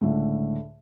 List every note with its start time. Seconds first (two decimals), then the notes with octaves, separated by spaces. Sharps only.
0.01 C#2 A2 D3